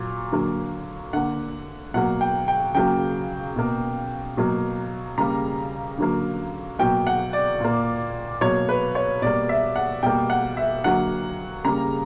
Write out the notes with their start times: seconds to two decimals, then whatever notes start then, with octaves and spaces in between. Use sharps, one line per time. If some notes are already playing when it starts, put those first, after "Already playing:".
Already playing: A#2 F#3
0.32 D3 F#3 A#3
1.13 D3 A#3 F#5
1.94 B2 F#3 A#3 F#5
2.21 G5
2.48 G5
2.75 C#3 F#3 A#3 G5
3.56 B2 A#3
4.37 B2 F#3 A#3
5.18 C#3 G3 A#3 A#5
5.98 D3 F#3 A#3
6.79 B2 F#3 A#3 G5
7.07 F#5
7.33 D5
7.60 A#2 A#3
8.41 B2 F#3 A#3 C#5
8.69 B4
8.95 C#5
9.22 B2 G3 A#3 D5
9.49 E5
9.76 F#5
10.03 B2 G3 A#3 G5
10.30 F#5
10.57 E5
10.84 D3 F#3 A#3 F#5
11.65 C#3 G3 A#3 A#5